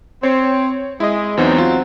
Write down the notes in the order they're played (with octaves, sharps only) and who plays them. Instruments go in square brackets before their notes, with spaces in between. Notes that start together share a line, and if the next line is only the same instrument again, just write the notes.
[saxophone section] C4 [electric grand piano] C#5
[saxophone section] G#3 [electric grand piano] E4 D#5
[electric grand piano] E2 E3 D#4 [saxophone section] F#3 C4
[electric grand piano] F4